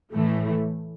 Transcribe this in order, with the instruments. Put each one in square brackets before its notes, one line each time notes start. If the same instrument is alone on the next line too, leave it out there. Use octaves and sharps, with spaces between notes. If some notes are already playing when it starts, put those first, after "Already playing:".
[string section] A2 E3 A3